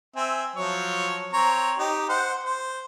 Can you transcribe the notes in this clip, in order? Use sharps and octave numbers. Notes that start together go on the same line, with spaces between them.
C4 E5 G#5
F3 F#3 C#5
C4 C#5 A#5
D#4 G4
C5 F#5
C5